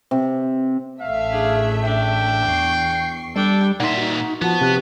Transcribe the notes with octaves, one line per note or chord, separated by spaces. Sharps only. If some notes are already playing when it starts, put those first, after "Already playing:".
C3
A1 A3 E5 F5
D4 G#4
D4 G5
E2 C#6 C7
G3 D4 A4 G5
A#2 D#4 E5 F#5 C6
D#4 F#4
F3 B3 F#4 A5
C3 F#6